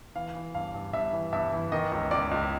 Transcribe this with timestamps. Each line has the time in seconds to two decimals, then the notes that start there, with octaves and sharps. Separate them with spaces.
0.16 E3 F5
0.35 E3
0.55 G2 F5
0.74 G2
0.93 G2 E5
1.13 E3
1.33 G2 E5
1.52 E3
1.72 D#3 D#5
1.92 C#2
2.11 C#2 D5
2.31 C#2